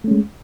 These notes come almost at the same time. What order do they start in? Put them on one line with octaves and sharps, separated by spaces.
A3 C#4 G#3